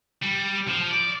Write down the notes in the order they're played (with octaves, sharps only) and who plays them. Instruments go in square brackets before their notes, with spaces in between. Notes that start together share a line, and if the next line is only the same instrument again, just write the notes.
[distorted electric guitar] G3
F3
D5